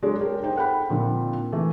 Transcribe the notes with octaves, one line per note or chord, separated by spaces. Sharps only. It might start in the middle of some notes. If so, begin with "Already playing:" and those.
F#3 G#3 D4 A4 C#5
G4 G#4 A#4
D#4 C5 G5
A4 F#5 G5 B5
A#2 D3 F3 C4 D#4
E3 A3